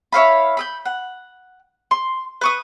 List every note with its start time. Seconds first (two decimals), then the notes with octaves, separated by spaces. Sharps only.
0.12 E4 C#5 F5 B5
0.57 B5 D#6 G6
0.85 F#5
1.91 C6
2.41 B4 C#6 D#6